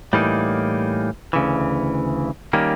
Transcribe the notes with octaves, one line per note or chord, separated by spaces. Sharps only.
A2 E3 G3 A#3 D#4
D2 C#3 E3
D#3 G3 A#3 C#4